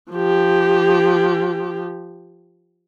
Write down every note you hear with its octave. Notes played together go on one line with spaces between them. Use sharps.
F3 G4